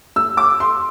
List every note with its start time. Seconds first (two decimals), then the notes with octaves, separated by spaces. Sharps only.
0.16 E6
0.37 D6
0.60 C6